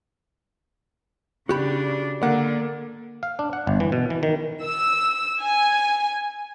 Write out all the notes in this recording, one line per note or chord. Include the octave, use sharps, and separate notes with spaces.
C#3 D4 F#4 G4 B5
D3 A#3 F#5
F5
D4
F#5
G1
E3
B2
E3
D#3
E6
G#5